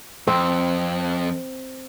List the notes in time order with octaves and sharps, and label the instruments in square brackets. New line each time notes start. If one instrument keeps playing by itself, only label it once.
[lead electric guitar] F2 [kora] C4